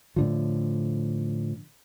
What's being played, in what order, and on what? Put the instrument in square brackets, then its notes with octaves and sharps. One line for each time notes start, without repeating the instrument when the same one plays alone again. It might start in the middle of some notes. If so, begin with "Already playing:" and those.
[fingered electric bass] A2 D3 F3